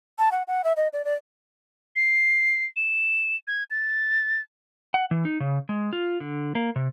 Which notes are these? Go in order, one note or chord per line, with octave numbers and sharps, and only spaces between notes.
A5
F#5
F#5
E5
D#5
D5
D5
C7
E7
G#6
A6
F#5
E3
D#4
C#3
G#3
F4
D3
A#3
C3